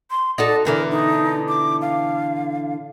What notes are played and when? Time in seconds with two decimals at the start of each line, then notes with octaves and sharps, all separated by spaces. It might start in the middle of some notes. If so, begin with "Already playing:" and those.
0.10 C6
0.38 D#4 F#4 A4 D5
0.65 B2 D3 E3 A#4
0.91 D#4
1.49 D6
1.81 F5